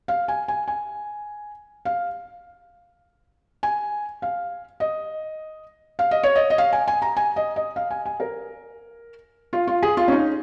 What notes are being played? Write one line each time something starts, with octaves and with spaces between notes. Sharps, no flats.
F5
G#5
G#5
G#5
F5
G#5
F5
D#5
F5
D#5
C#5
D#5
D#5
F5
G#5
G#5
A#5
G#5
D#5
D#5
F5
G#5
G#5
A#4
F4
F4
G#4
F4
C#4
D#4